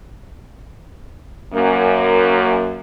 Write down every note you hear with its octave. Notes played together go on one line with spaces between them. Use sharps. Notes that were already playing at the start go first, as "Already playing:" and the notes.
F#2 A#3